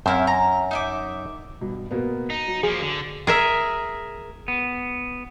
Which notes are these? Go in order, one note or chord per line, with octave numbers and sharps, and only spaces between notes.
F#2 C4 E4 F5
A#5
D#4 E5 D6
G2 B2
B2 A#3 B3
D#4
F#3
F3 A#3 G#4
D3
G#4 A#4 E5
B3